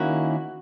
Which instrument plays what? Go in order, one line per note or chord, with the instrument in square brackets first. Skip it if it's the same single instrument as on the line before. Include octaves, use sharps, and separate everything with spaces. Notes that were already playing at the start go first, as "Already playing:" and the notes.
Already playing: [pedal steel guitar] D#3 A#3 C#4 E4 [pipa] F#4